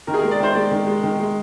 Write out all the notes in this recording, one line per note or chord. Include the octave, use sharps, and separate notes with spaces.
D#3 A#4
G#4
A#4
G#3
D5
D#3 C5
G#3 D5
D#3
G#3
D#3
G#3